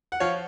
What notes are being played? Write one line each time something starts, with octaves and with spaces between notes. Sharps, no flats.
F#5
F3 C#5 F5